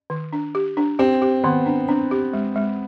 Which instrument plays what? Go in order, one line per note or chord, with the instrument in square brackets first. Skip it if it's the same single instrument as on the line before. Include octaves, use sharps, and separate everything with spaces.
[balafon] D#3
D4
G4
D4
[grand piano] C4 [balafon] G4
[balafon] G4
[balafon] D#3 [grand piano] B3
[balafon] D4
[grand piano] C4 [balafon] D4
[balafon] G4
G#3
G#3